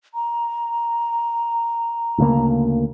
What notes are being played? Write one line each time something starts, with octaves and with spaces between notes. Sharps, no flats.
A#5
D2 C#3 A#3